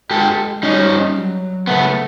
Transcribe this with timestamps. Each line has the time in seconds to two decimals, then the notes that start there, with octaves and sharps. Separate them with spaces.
0.11 G#3 G4 A4
0.63 G3 C#4 D#4
1.15 F#3
1.67 C#3 A3 B3